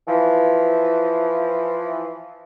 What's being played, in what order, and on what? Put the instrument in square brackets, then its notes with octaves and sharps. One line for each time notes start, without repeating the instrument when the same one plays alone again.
[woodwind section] E3 F3